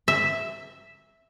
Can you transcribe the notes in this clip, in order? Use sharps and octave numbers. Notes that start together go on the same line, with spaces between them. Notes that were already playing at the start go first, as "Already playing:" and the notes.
E5